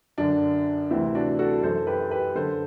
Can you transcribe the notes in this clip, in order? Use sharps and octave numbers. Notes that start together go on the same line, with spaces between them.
F#2 D3 D4
D2 C3 E3 C4 E4
D4 F#4
F#4 A4
F#2 E3 A4 C5
G4 B4
G4 B4
F#2 D3 A4 C5